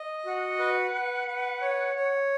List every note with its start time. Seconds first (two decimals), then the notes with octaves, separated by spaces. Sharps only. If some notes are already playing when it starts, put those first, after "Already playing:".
Already playing: D#5
0.26 F#4 F#5
0.59 B4
0.93 B4
1.27 B4
1.62 C#5
1.96 C#5